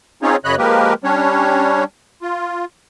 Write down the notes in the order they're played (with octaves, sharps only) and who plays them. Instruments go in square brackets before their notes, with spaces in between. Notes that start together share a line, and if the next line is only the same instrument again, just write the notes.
[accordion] C4 C#4 D#4 F4 G#4 C#5
F#2 C#3 C#5 D#5 B5 F#6
F3 G#3 A#3 G4 A#4 B4
G3 C#4 D4 C#5
F4